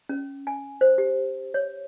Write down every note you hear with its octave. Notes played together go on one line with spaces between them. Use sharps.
C#4
G#5
C5
G4
C#5